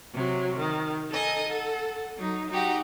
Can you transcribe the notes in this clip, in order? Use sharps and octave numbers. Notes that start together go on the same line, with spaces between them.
C3 F#3
D#3
D#4 A4 D#5 G#5
A4 F#5
F#3 D#4
D#4 F#4 G4 F#5